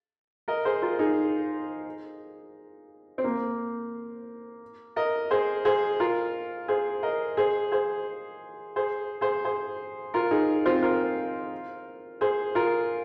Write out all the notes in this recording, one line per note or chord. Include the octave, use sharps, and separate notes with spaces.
A#4 D#5
G#4 C5
F4 A#4
D#4 G#4
C4
A#3
A#4 D#5
G#4 C5
G#4 C5
F4 A#4
G#4 C5
A#4 D#5
G#4 C5
G#4 C5
G#4 C5
G#4 C5
G#4 C5
F4 A#4
D#4 G#4
C4 F4
F4 A#4
G#4 C5
F4 A#4